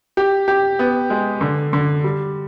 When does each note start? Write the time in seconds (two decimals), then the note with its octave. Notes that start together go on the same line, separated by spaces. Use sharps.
0.17 G4
0.48 G4
0.79 B3
1.10 G#3
1.41 D3
1.73 D3
2.04 G3